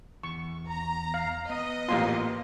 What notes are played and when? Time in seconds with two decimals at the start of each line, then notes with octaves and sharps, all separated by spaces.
0.23 E2 C#6
0.69 A#5
1.14 F5
1.50 B3 D#5
1.89 A1 A#2 F4 G4 C6